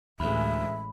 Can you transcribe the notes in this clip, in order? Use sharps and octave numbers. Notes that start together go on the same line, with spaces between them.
A1 D2 G#3 E5 B5